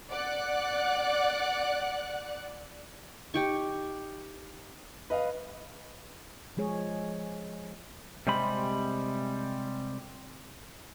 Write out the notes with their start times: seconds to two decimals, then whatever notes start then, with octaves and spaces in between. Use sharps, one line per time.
0.10 D5 F#5 F#6
3.34 D#4 G4 G5 C#6
5.10 B4 D#5 F5
6.57 F3 G#3 G#4 C#5
8.27 C3 G3 G#3 C4 B5